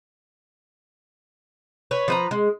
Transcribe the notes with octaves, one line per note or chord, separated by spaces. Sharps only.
B4 C#5
F3 B4 A#5
G#3